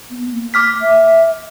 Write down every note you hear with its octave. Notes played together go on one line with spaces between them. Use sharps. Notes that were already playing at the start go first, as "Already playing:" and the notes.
B3
A#3
D6 F6 B6
E5